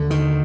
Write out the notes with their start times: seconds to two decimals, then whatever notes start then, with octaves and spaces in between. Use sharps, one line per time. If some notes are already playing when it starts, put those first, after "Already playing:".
Already playing: D#2 D3
0.10 D#3